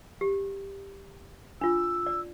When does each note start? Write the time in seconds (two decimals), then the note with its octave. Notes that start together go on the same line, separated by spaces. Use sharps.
0.21 G4
1.61 D4 F4 E6
2.06 D5